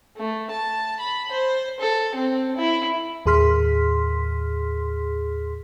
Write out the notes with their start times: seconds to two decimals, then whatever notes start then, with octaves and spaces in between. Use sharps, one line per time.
0.17 A3
0.51 A5
1.00 B5
1.32 C5
1.80 A4
2.15 C4
2.56 E4
3.26 D#2 A2 G#4 C6 F6 B6